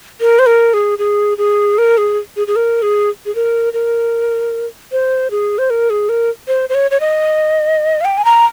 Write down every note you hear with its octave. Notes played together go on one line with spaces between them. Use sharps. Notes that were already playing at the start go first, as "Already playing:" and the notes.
A#4
C5
A#4
G#4
G#4
G#4
A#4
G#4
G#4
G#4
A#4
G#4
G#4
A#4
A#4
C5
G#4
C5
A#4
G#4
A#4
C5
C5
C#5
C#5
D#5
F5
G5
G#5
A#5